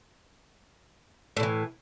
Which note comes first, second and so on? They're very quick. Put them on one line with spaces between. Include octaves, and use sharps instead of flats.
A2 D3 E3